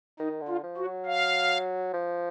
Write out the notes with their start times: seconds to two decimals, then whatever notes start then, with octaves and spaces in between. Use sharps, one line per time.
0.20 D#3 D#4
0.41 D3
0.48 F4
0.63 F3
0.77 F#4
0.85 F#3
1.06 F5
1.93 F3